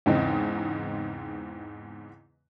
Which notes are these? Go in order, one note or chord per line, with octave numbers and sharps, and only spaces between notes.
E2 G#2 C#3 E3 C4 D#4